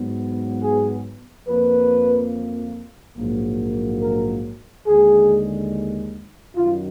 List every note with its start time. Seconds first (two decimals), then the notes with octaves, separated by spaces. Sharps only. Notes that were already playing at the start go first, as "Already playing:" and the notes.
Already playing: G#2 F#3 B3
0.62 G#4
1.47 F2 F3 A#3 B4
3.17 A#1 G#2 F#3 A#3
4.02 A#4
4.87 D#2 D3 G#3 G#4
6.57 F#2 D#3 F#3 F4